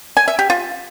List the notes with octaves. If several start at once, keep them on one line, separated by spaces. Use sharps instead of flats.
G#5
E5
G4
F4